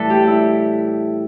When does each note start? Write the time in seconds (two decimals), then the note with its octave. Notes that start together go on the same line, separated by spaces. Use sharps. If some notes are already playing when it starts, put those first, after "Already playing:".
Already playing: A2 E3 G3 A4 B4 D5 E5
0.10 G4
0.27 E4